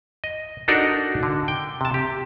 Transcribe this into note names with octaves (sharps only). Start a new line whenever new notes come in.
D#5
D4 D#4 F#4 A4 A#4 D5
D3
G5
C3 A5
G4